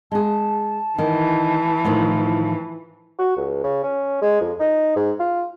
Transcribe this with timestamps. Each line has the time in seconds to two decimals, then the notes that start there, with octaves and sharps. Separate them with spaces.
0.12 G#3 G#4 A5
0.98 D#3 E3
1.85 A2 D#3 F3
3.19 F#4
3.37 C#2
3.64 C#3
3.83 C#4
4.22 G#3
4.41 F2
4.59 D#4
4.96 G#2
5.20 F4